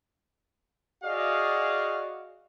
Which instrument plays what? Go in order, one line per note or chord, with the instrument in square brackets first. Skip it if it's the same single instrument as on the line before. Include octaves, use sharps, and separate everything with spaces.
[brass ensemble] F#4 G#4 D5 D#5 F5